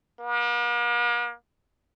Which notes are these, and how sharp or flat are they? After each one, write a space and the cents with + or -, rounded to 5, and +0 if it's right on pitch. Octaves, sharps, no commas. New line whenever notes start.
A#3 +45